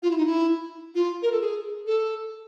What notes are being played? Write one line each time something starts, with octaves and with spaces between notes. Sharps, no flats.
F4
E4
D#4
E4
F4
A#4
A4
G#4
A4